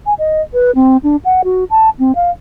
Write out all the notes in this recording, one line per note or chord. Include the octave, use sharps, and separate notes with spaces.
G#5
D#5
B4
C4
D4
F#5
F#4
A5
C4
F5